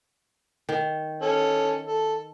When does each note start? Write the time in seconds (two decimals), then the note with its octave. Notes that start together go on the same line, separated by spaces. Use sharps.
0.69 D#3
1.22 C#4 A4
1.86 A4